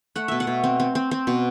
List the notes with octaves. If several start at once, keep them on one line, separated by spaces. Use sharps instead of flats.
A3 F#5
B2 E5
F#5
B2
C4
C4
C4
C4
B2